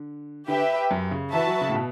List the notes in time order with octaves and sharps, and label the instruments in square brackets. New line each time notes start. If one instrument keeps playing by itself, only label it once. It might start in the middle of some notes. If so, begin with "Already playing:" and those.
Already playing: [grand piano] D3
[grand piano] D3 [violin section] G4 B4 E5 G5
[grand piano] F#2
C#3
[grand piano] E3 [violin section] F#4 B4 E5 A5
[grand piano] F#3
C#3
A2
B2